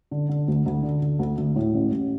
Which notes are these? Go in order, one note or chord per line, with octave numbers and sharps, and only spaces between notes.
D3
D3
D2
D2
D3
D3
D2
D2
A2
A1
A1